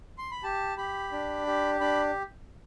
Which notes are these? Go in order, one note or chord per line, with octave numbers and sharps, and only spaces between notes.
C6
B5
G4 A5
G4 B5
D4
G4
D4 B5